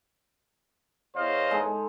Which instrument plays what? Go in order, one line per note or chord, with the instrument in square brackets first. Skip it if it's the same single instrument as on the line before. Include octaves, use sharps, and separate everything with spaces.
[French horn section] E2 C#5 [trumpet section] C5 D#5 F5
[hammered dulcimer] G#3 D#4 A4